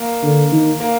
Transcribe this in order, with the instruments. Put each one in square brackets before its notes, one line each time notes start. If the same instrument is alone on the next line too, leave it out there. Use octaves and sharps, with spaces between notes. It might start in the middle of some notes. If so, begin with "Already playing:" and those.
Already playing: [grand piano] A#3
[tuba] D3
D#3
[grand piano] A#3